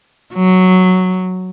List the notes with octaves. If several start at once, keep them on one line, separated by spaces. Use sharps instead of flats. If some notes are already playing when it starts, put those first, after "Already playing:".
F#3